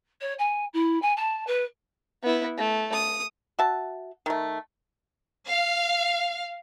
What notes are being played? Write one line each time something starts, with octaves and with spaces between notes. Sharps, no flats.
C#5
G#5
E4
G#5
A5
B4
B3 E4
A3
D#6
F#4 E5 A5
D#3 A3
F5